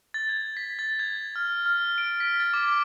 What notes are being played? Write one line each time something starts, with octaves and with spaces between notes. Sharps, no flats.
A6
G#6
B6
A6
G#6
F6
F6
D7
B6
A6
D6